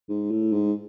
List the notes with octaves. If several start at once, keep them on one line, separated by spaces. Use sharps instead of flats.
G#2
A2
G#2